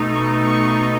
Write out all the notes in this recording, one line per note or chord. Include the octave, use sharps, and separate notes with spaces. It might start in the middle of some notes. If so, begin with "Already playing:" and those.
Already playing: B2 A3 D#4
C#6
C#6